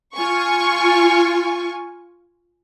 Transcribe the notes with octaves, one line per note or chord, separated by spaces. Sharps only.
F4 G#5 C#6